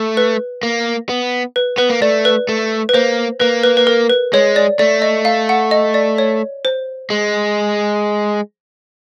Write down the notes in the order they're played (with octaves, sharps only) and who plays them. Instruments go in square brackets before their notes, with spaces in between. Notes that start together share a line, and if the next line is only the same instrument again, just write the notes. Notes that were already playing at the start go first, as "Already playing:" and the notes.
Already playing: [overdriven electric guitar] A3
[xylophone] B4
[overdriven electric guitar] A#3
B3
[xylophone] B4
[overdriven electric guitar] B3 [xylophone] B4
[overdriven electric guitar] A#3
[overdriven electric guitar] A3 [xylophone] D5
[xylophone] B4
[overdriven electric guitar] A3
[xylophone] B4
[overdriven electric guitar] A#3 [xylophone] C5
[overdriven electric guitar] A#3 [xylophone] B4
[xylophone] B4
B4
A#4
B4
[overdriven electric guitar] G#3 [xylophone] C#5
[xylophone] D5
[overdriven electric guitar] A3 [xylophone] D5
[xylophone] D#5
F5
F#5
D#5
D5
C#5
C5
[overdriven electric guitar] G#3